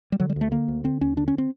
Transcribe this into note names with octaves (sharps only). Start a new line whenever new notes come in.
G3
D3 F#3
G3
D2 A3
D3 A#3
D2
D3 C4
D#2 C#4
D3 D4
C#4
C4